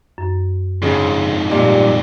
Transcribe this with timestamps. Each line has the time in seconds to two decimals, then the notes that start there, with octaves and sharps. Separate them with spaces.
0.18 F#2
0.82 F2 G#2 C#3
1.51 A#2 G3 G4 D5 D#5